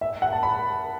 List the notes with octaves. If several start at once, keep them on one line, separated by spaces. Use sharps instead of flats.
E5
F#5
A5
B5